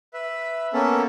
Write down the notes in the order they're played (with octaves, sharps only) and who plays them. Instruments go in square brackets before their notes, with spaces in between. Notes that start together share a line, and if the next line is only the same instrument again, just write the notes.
[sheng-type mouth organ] B4 E5
A#3 B3 C#4 A4